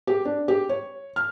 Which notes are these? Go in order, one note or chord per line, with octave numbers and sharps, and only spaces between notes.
G4
D4
G4
C#5
F6